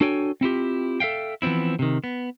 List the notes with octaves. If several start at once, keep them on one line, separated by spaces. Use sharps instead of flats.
D4 F#4 A4 C#5 G5 G#5
C4 E4 F4 G4
A4 E5 F5 G5
E3 F3 B3 C4 E4
C3 D#3
B3